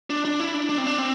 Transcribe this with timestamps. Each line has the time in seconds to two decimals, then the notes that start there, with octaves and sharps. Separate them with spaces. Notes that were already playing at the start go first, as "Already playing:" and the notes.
0.10 D4
0.25 D4
0.40 E4
0.54 D4
0.69 D4
0.78 C4
0.87 D4
0.98 C4